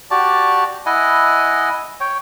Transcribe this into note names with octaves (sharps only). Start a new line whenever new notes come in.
F#4 G4 D5 A5
E4 D#5 F#5 G#5
C#5 G5